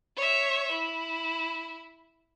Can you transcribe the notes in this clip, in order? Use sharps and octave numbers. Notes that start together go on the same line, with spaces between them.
C#5 E5
E4